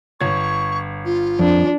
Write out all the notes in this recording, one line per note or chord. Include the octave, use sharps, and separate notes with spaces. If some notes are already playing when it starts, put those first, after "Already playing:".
G1 C#5 C#6 G#6
F4
F2 D4